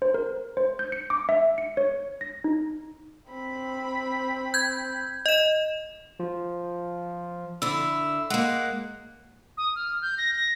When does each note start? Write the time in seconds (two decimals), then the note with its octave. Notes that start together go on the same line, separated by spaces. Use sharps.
0.02 C5
0.14 A#4
0.57 C5
0.79 G6
0.92 C#7
1.10 D6
1.29 E5
1.58 C#7
1.77 C#5
2.21 A#6
2.44 D#4
3.32 C4 B5
4.54 G6 G#6
5.26 D#5 E7
6.19 F3
7.62 D3 E4 E6
8.30 G#3 A#3 F#5
9.57 D#6
9.75 F6
10.02 G6
10.18 A#6
10.35 A#6